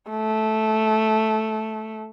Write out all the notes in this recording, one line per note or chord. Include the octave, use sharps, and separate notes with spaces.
A3